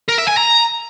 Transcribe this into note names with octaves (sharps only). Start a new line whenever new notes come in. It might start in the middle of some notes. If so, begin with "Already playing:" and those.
A#4
E5
G#5
A#5